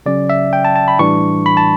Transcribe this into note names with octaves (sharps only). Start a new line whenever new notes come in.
C#3 F#3 C#4 D5
E5
G5
A5
A5
B5
A2 E3 G3 D4 C#6
B5
A5